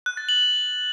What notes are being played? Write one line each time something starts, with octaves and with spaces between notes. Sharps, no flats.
F#6
A6
F#7